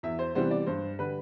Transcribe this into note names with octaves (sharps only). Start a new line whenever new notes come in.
E2 E5
C5
C3 E3 G3 B3 C5
D5
G2 C5
D3 G3 B4